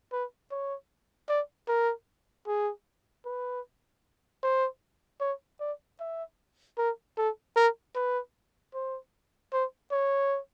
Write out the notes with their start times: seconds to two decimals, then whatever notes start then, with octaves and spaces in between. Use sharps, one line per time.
0.12 B4
0.51 C#5
1.29 D5
1.68 A#4
2.47 G#4
3.25 B4
4.43 C5
5.20 C#5
5.60 D5
6.00 E5
6.78 A#4
7.18 A4
7.56 A#4
7.95 B4
8.74 C5
9.53 C5
9.92 C#5